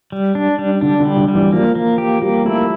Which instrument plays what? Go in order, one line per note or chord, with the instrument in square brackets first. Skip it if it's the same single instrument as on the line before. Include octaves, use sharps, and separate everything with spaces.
[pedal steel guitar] G3
D4
G3
[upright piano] D3 [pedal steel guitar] D4
[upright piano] D3
[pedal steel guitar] G3
[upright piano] D3
[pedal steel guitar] G3
[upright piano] E3
[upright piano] F3 [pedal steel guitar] A#3
[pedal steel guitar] A#3
G4
[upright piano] G3 [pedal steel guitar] A#3
[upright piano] A3 [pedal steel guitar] E4